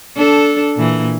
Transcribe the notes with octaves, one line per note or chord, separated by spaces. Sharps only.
D4 A4
A#2 E3